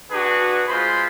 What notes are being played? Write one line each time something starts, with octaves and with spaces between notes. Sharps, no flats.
D4 F#4 G#4 B4
G#3 F4 C5 B5